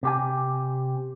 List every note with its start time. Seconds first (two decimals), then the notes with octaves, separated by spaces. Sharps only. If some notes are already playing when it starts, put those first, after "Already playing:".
0.03 C3 G4 G#5